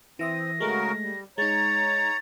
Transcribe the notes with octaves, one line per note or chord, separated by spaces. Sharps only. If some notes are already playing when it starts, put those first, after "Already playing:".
E3 C4 E5 D#6 A#6
C#3 G#3 A3 F#4 A#4
G3
G#3 D#4 C#5 A#5 A6